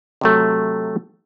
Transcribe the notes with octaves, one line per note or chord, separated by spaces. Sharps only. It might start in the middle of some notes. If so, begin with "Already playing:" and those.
C3 F#3 A3